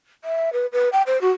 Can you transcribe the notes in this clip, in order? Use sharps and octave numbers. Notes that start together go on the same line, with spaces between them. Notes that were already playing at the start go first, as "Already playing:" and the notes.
E5
B4
B4
G5
C5
F#4